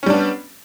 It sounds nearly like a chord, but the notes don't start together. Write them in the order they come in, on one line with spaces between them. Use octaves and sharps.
C#4 G3 D4 B3